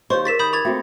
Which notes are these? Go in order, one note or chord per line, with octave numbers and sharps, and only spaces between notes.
D#2 G4 C5 C#5 D#5 C#6
G#4 A#4 A6 B6 E7
D#3 B5 D#6 G6
D6 G#6 A6 F7
A3 A#3 C4 F#4 E5 G5